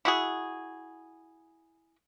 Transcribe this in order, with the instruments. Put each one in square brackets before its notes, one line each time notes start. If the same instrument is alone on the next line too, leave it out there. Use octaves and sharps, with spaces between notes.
[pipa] E4 F#4 G#4